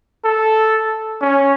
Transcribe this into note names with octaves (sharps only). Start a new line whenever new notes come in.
A4
C#4